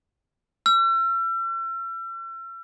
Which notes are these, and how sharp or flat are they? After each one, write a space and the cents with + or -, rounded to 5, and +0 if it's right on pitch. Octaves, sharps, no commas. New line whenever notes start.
E6 +40